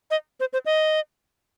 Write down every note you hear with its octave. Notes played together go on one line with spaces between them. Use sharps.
D#5
C5
C5
D#5